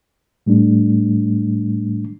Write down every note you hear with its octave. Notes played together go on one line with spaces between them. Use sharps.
A2 G3 A3 D4